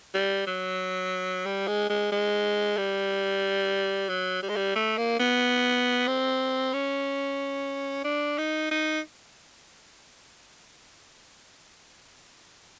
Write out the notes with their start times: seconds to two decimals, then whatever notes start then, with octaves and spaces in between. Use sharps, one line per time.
0.15 G3
0.47 F#3
1.46 G3
1.68 G#3
1.90 G#3
2.12 G#3
2.77 G3
4.09 F#3
4.43 G3
4.49 G#3
4.56 G3
4.76 A3
4.98 A#3
5.20 B3
6.07 C4
6.73 C#4
8.04 D4
8.38 D#4
8.71 D#4